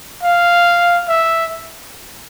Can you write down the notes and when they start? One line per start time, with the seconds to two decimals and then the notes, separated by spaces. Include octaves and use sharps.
0.23 F5
1.08 E5